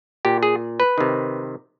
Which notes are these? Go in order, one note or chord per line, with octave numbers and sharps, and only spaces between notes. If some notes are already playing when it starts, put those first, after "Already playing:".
A#2 G4
G#4
B4
C3 D#3